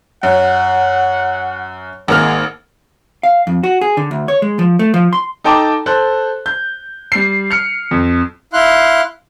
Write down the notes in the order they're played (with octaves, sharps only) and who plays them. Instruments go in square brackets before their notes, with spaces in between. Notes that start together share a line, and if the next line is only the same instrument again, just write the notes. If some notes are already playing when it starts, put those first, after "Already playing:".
[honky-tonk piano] F#2 [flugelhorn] F#5
[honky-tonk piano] G#1 A#3 F6 [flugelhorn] G#3
[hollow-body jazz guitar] F5
F2
F#4
G#4
D3
D2
C#5
G#3
F3
A3
F3
C6
[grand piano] D#4 A4 G5 A5 A#5 D6
A4 C5 F#6
G6
G3 C7
F6 C#7
F2
[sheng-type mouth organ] E4 F5 C6 F#6